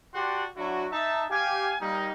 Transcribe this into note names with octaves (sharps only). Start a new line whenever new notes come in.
F#4 G4 D5 F#5 A5 C6
F#3 D4 E4 F#4
D#4 E5 A5
G4 F5 G#5
G3 A#3 D#4